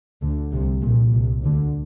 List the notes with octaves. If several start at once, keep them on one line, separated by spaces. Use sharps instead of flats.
D2 D3
C2 C3
A#1 A#2
C2 C3
D2 D3